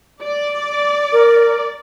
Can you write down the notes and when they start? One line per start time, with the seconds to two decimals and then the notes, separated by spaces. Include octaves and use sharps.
0.22 D5
1.13 A#4